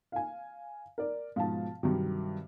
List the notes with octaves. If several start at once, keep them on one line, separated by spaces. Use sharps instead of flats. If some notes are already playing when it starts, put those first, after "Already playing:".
F5 G#5
A#4 D5
G#2 B2 F3 F5 A5
G2 C3 D#3 F#3